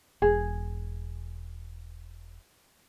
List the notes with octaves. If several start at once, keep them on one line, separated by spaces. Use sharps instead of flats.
E1 G#4